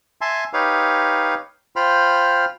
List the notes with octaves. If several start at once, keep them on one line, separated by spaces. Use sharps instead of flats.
E5 G#5 A5 C6
D#4 G4 B4 C#5 F5
F4 C5 G5 B5 F6